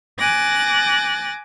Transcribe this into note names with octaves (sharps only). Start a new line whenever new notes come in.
G#5 D6 F#6 A6 A#6